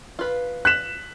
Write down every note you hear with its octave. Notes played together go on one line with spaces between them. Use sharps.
F4 B4
F#6 B6 E7